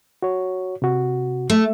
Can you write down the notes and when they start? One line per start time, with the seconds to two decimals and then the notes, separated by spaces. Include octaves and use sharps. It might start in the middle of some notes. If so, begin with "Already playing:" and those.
0.22 F#4 C#5
0.82 C3 F#4
1.50 A3